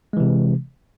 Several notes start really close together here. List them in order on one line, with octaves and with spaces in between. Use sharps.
G#3 E3 C3